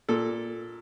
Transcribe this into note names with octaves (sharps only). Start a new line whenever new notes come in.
A#2 A4